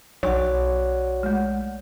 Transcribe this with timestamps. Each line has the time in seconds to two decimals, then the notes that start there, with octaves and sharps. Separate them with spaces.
0.23 B1 F#4 C#5 D5 F#5
1.23 G#3 A3